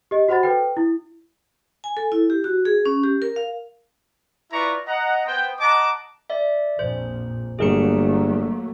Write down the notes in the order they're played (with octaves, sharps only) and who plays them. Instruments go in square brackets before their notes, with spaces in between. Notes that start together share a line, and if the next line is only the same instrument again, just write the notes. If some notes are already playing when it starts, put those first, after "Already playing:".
[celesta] G4 D#5
F#4 C5 F#5 B5 A6
A4 B4 G5
E4
[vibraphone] G#5
A4
E4
G4
F#4
G#4
C#4
G4
A#4
F5
[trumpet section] E4 F4 B4 D5 A#5 C#6
D#5 F#5 A#5
B3 C5 G5
D#5 F#5 A5 A#5 D6
[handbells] D5 E5
[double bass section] A#1 F2 A#2 [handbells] C5
[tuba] G1 [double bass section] F#3 A3 A#3 [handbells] G#4 A#4 C#7